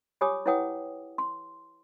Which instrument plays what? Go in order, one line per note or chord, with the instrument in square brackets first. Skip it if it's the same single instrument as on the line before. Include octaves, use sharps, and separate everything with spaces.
[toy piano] F4 G4 C#5 G#5 D6 D#6
E4 B4 C#5 F#5 G5 D#6
C6